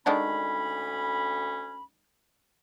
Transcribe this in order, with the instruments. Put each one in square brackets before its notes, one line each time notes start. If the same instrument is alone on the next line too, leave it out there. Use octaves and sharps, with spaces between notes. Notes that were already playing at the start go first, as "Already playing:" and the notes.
[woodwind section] D2 C#4 B5 [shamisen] D#3 G#3 D4